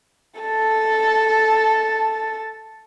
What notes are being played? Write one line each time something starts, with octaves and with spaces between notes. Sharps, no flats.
A4 A5